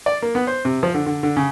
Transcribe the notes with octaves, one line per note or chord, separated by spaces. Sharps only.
D5
A#3
B3
C5
C3
F3
D3
D3
D3
C#3